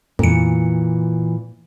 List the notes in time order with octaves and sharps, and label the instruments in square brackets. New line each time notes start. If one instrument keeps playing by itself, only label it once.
[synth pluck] F2 C#7 [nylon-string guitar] A#2 E3